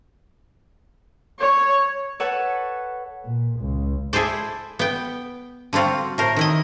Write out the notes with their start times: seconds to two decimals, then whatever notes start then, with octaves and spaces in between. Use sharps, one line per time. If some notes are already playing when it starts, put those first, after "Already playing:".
1.40 C#5
2.20 A4 B4 C#5 F#5
3.26 A#2
3.60 C#2
4.13 E4 G#4 A4 C5 D5
4.79 B3 G5
5.73 D3 G3 C4 F4 F#4
6.18 A2 A#4 C5
6.36 D#3 E4 D#5